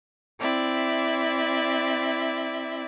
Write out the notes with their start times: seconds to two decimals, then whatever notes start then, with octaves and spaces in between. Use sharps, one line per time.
0.39 C4 E4 D5 E5